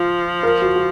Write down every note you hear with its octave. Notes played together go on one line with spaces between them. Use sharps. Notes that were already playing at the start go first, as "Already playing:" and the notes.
Already playing: F3 F4
A#4
F#4
F#4